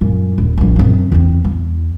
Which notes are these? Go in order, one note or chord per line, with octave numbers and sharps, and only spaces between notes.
F#2 A#2
D#1
A#1 C3
F#2 C3
E2 C4
E2